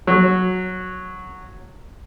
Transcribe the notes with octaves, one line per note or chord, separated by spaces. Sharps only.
F#3